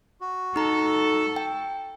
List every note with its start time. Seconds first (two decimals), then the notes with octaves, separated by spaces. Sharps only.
0.21 F#4
0.56 D#4 A4 A#5
1.36 G5